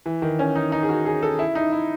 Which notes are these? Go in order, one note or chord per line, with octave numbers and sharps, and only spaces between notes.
E3
D#3
C#4
D#4
D#4
G#4
F#4
G#4
A4
E4
D#4
E4